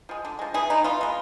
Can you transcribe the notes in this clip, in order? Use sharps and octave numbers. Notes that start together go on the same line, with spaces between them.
F3 G#3
D3
F3 G#3
E3 G#4
G#3 B3 D#4
E3 F4
G#3 B3